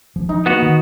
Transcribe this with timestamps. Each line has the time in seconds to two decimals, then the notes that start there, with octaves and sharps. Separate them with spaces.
0.16 E1 F3
0.29 F3 D#4
0.46 A#3 B3 F#4
0.63 D#3